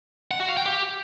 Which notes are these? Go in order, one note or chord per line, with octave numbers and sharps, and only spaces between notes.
F#5
F#4
F5
G5
G4